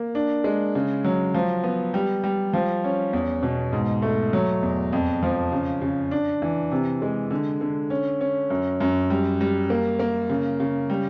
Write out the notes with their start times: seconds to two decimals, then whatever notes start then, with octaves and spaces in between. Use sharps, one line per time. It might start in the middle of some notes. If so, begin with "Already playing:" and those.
Already playing: A#3
0.15 D4
0.44 G#3
0.75 C#3
1.04 F#3
1.34 F3
1.63 B3
1.94 G3
2.24 G3
2.53 F3
2.84 C#4
3.13 E2
3.43 B2
3.73 G#2
4.02 A3
4.33 F#3
4.63 E2
4.93 F2
5.22 F3
5.52 C#3
5.81 C#3
6.11 D4
6.42 E3
6.71 C3
7.02 G#3
7.31 D3
7.61 D3
7.90 C#4
8.21 C#4
8.50 F#2
8.80 F#2
9.10 G3
9.41 G3
9.70 A#3
9.99 A#3
10.29 C#3
10.60 C#3
10.90 G3